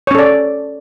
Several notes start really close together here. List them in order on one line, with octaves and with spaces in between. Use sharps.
C#5 C#4 A4 D5